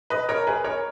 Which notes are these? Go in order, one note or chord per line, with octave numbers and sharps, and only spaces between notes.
B4 D#5
A#4 C#5
G#4 B4
A#4 C#5